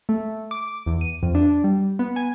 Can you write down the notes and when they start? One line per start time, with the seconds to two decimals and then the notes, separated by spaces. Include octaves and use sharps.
0.09 A3
0.51 D6
0.86 E2
1.01 D#7
1.23 F2
1.35 D4
1.64 G3
1.99 B3
2.16 G#5